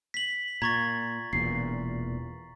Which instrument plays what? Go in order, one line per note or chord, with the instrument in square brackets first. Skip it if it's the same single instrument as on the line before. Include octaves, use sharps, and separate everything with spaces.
[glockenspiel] B6 F#7
[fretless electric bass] A#2 [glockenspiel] A#5 C#6 A6 [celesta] G#6
[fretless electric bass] E1 E2 A#2 [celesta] C7